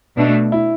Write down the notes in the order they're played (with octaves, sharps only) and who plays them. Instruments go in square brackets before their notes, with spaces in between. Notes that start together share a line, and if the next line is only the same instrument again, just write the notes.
[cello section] B2 A3 D4
[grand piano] E4